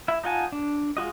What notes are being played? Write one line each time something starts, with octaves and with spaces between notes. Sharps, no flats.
E4 E5
D#4 F4 F#5 G#5 A5
D4
G#3 F4 F#4 D#5